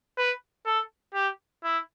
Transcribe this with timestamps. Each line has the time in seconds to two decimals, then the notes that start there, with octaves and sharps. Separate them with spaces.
0.18 B4
0.66 A4
1.14 G4
1.64 E4